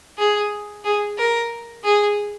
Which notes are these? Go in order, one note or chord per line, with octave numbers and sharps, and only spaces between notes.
G#4
G#4
A#4
G#4